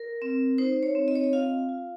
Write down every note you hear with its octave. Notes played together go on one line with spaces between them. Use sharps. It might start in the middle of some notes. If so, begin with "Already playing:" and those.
Already playing: A#4
C4
D#4 C5
C#5
C4
D#5
C#5
D#5
F4 F5
F4